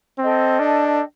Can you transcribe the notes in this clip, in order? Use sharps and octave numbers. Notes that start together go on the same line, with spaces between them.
C4 A4 D#5 G5
D4